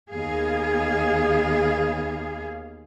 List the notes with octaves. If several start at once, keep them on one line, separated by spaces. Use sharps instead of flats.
D#2 B3 G#4 F5